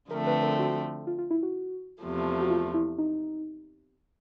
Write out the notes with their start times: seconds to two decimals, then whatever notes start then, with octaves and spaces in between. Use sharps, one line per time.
0.11 D3 F3 A3 C4 A#4
0.27 B4
0.43 A#4
0.59 F#4
1.07 F4
1.19 F4
1.31 E4
1.43 F#4
2.02 E2 C3 F3 A3
2.41 F#4
2.50 F4
2.74 E4
2.98 D#4